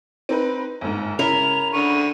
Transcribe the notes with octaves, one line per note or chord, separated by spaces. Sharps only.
C4 D#4 B4
G1 G#2
C#3 E4 A#4 F7
D3 C#6 D#7